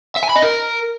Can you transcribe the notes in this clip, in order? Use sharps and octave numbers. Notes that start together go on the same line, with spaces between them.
E5
G#5
B5
D#5
A#4